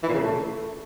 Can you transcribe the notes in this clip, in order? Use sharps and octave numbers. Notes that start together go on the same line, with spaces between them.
E3
A#2
C#3
A2
A3